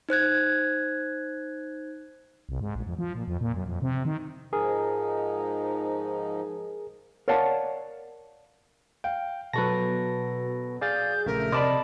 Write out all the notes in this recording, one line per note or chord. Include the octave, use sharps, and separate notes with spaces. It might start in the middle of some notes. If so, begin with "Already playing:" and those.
D#4 C5 F#6 G#6
C2
G#2
A#1
F2
F3
A#2
F2
A#2
F#2
F2
C3
D#3
G#2 F3 D#4 G#4 A#4
A#4 C#5 D5 F5 F#5 A5
F5 G5
B2 F#3 A4 B4 A5 C#6 A#6
G#4 D5 F5 G6 A6
A#1 C#3 A3 A#4 E5
C3 D5 D#5 A5 B5 D6